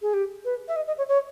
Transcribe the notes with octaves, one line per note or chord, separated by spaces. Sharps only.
G#4
G4
B4
E5
D#5
D#5
C#5
C#5